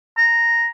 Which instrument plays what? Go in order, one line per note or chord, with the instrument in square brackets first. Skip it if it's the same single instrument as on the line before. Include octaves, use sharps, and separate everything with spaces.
[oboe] A#5